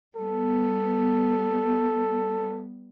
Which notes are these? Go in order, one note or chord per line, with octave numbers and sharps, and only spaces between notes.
G3 B3 A4